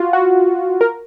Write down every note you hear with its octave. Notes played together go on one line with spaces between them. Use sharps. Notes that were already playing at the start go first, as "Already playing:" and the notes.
Already playing: F4 F#4
F#4
A#4